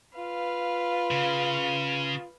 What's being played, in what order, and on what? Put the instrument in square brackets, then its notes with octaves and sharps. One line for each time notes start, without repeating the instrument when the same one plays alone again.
[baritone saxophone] F4 [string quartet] B4 F5
[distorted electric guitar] C#3